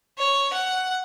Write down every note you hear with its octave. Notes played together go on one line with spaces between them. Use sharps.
C#5
F#5